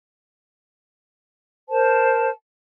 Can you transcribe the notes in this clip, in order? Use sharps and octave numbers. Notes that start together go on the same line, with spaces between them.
A#4 C5 A5